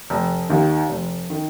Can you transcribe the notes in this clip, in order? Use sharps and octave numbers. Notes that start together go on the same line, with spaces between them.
F1
D#2 D#3
F1
D#3